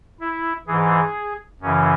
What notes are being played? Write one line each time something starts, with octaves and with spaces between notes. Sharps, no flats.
E4
G#2 E3 G#4
F#2 C#3 E3 C#4